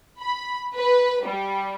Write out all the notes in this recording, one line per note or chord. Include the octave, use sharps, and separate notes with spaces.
B5
B4
G3